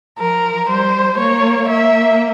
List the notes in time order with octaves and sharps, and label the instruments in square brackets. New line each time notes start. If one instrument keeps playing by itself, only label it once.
[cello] F3 [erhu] A#4
[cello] G3 [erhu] C5
[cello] A#3 [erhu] C#5
[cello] A#3 [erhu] E5